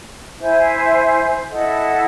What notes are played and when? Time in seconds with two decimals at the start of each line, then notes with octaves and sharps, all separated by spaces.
0.39 E4 C5 E5 G#5
1.51 E4 A4 D#5 F#5